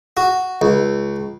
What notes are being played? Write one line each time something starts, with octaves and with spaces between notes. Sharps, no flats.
F#4
C#2